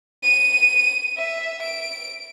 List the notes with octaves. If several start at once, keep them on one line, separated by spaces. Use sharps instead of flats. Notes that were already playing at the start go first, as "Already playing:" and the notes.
D#7
E5
D7